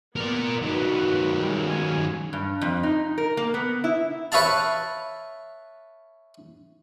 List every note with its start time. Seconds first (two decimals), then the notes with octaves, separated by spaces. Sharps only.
0.16 A#3 B3 A#4 D5
0.63 D#3 F#3 F#4 B4
1.36 G3 G#3
1.65 G#3 C#4 G#5
2.33 G2
2.62 F2
2.83 D#4
3.18 A#4
3.37 A#3
3.54 B3
3.84 E4
4.32 B4 C#5 E5 F5 A5